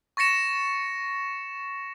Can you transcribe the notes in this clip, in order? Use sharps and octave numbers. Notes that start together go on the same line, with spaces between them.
C#6 A6 A#6 C#7 E7